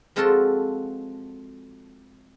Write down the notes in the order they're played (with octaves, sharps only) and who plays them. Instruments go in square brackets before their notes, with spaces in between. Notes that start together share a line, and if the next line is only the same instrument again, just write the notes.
[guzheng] F3 G#3 C4 F4 F#4 A4